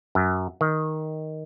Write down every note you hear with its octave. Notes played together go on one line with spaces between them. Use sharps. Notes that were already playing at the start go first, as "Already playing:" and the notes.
F#2
D#3